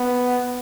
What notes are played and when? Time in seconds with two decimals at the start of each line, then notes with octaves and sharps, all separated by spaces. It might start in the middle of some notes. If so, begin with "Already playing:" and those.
Already playing: B3